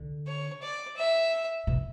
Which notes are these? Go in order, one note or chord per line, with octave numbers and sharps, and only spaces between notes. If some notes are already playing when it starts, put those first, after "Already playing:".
Already playing: D3
C#5
D5
E5
B2